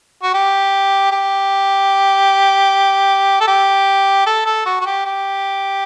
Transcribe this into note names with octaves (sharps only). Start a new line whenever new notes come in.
F#4
G4
G4
A4
G4
A4
A4
F#4
F#4
G4
G4